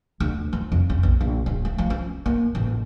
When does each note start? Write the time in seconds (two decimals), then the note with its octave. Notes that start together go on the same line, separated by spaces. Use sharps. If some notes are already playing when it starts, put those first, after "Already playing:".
0.20 D2
0.53 F3
0.72 F2
0.90 C#4
1.03 A#1
1.21 A#1
1.46 D1
1.65 A3
1.78 F3
1.90 C#4
2.26 A#3
2.55 A1